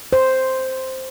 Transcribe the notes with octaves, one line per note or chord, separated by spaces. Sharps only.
C5